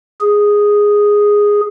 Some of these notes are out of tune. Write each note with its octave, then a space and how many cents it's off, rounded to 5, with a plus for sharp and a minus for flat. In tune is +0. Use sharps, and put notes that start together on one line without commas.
G#4 -5